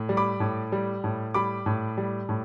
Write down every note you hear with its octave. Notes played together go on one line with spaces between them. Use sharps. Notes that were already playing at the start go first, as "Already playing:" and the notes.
Already playing: A2
G3
B5 D6
A2
G3
A2
G3 B5 D6
A2
G3
A2